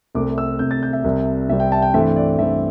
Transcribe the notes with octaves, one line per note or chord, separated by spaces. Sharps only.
C2 C3 A3 C4 D6
E6
C2 C3 A3 C4 G6
A6
G6
E5
C2 C3 G3 C4
C2 C3 G3 C4 E5
G5
A5
G5
G2 E3 A3 C4 E5
D5
G2 E3 A3 C4 E5